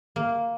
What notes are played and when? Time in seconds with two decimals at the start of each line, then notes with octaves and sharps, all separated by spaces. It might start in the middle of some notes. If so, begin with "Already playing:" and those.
0.16 A#3